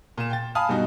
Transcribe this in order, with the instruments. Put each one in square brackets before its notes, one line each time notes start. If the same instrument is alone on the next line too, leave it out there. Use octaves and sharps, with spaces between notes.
[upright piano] A#2 E7
G5 A6
F5 G#5 A5 B5 D#6 F6
G2 B2 D#4 F#4